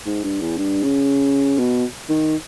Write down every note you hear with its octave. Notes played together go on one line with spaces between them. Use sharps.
G#2
G2
E2
G2
C#3
B2
D#3